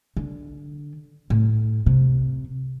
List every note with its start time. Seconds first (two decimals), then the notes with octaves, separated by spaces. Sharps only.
0.17 D3
1.30 A2
1.86 C3